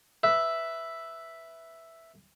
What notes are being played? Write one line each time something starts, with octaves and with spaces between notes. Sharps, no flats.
B4 E5